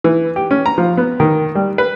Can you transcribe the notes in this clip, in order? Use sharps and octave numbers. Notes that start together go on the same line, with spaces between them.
E3
G4
C#4
A#5
F3
B3
D#3
G3
B4